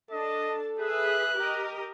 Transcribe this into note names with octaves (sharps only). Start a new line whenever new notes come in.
D4 A4 D#5 A5
G#4 B4 E5 F#6
G4 A#4 D#5